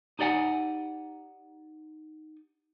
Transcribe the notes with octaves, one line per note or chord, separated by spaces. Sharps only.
D#4 G4 D5 F#5 G#5